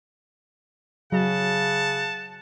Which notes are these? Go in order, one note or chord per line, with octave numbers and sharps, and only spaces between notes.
C#3 F#3 F#5 A5